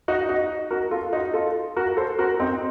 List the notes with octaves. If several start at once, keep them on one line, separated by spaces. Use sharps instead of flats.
D#4 F#4
D#4 F#4
F#4 A#4
F4 A4
D#4 F#4
F4 A4
F#4 A#4
A4 C5
F#4 A#4
C4 D#4